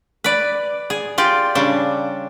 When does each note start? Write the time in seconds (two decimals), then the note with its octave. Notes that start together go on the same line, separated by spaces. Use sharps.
0.24 B4 D5
0.90 G#4
1.18 F4 G4 D5
1.55 C#3 G3 D4